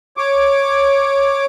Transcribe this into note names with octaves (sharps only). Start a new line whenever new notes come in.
C#5 D6